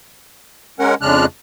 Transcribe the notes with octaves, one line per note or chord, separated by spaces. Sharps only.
G#3 C#4 A#4 F#5
F2 C#3 G#3 D4 F6 F#6